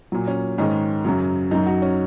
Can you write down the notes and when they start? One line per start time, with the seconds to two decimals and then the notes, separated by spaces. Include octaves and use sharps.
0.12 A#2 F#3
0.28 C#4
0.58 G#2 D#3 G#3 C#4
1.05 F#2 C#3 F#3
1.51 F#2 F#3 D#4
1.67 F#4
1.82 C#4